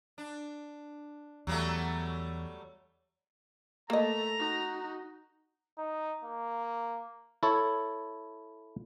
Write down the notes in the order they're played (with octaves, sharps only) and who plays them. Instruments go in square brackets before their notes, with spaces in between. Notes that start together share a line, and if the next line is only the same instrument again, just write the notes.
[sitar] D4
[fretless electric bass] E2 [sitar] F#3 G3 A3
[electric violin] A3 A4 [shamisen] A#3 D#5 [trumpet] A#5
[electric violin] D#4 F#4
[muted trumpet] D#4
A#3
[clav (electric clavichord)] E4 A4 C#5